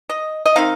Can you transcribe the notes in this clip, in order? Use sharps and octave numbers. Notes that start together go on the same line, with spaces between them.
D#5
D#5
D#3 C4 D#4 F5